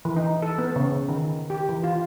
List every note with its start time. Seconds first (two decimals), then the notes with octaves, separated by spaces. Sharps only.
0.05 E3
0.16 D#4
0.42 A4
0.58 B3
0.76 C#3
1.09 D#3
1.50 G4
1.69 E3
1.84 F4